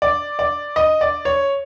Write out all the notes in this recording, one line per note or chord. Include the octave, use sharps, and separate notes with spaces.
D5
D5
D#5
D5
C#5